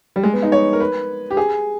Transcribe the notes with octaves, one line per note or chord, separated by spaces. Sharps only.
G3
G#3
B3
D#4
C#5
A#4
B4
G4
G#4